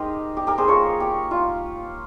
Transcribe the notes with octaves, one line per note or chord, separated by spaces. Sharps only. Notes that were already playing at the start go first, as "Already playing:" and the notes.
Already playing: G#3 D#4 G4 A#4 C5 D#5
G4
G4 A#4
G#4 C5
A#3 F4 A#4 C#5
G4
F4